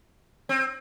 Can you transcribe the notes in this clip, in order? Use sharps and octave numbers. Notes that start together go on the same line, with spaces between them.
C4